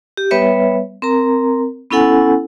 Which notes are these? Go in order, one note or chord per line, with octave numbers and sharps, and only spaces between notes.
G4
G3 B3 B4 C#5 E5
C4 A#4 A#5
B3 C#4 E4 A4 F#5 G#5